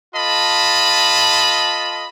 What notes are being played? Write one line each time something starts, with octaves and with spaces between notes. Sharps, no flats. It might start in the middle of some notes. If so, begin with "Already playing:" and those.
F4 A4 D#5 A5 B5